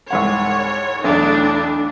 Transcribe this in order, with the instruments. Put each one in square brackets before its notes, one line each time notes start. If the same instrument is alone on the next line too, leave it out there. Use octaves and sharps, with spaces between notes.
[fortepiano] C2 G#2 F#5 [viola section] C#5
[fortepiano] B1 E2 [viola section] A3 D4 D#4